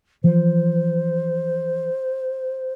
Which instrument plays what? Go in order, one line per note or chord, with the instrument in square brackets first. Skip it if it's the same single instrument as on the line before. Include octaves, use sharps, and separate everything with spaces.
[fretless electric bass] E3 F3 [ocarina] C5